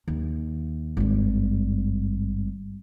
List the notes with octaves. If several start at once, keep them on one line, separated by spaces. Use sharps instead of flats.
D#2
G#1 G2